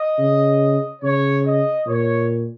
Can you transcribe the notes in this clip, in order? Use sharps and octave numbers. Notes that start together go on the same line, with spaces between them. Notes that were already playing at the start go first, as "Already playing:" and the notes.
Already playing: D#5
C#3
C#3 C#5
D#5
A#2 C#5